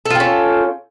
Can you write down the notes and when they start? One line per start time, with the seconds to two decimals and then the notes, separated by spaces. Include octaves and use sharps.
0.05 A4
0.10 F4
0.15 G5
0.20 C#4